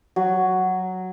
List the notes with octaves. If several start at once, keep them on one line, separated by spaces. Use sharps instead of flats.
F#3